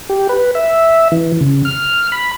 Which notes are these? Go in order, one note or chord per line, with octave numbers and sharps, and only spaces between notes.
G4
B4
E5
E3
C#3
F6
B5